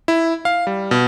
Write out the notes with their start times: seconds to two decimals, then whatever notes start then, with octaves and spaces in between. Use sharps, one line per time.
0.08 E4
0.45 F5
0.67 G3
0.91 B2